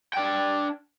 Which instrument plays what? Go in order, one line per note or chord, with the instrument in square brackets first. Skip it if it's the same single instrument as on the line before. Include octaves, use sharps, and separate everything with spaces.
[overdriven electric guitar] D4 G5